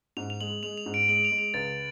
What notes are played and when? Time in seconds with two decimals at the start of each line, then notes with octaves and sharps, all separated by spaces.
0.17 G#2 F7
0.30 F7
0.40 G#3 F#7
0.63 G#3 F7
0.77 F7
0.86 G#2
0.94 D7
1.08 G#3 F#7
1.24 F7
1.31 G#3
1.39 F7
1.54 C#2 A6